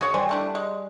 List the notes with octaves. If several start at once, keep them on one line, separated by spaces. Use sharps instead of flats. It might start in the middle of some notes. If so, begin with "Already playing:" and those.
F#4 G#4 C#5
G3 C5 G#5
A3 D4 E4
G#3